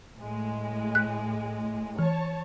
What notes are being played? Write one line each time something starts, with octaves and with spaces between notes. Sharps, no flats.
A2 G#3
F#6
E3 C#5 A5